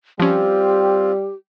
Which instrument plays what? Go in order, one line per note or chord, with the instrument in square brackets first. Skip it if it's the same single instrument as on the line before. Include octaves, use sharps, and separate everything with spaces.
[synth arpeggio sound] F3 C#4 [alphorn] G3 [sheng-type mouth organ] C4 F4 [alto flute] G4